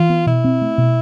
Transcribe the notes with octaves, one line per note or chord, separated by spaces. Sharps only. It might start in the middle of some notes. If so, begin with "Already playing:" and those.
Already playing: E3 F4
B3
B2 E4
C4
A3
B2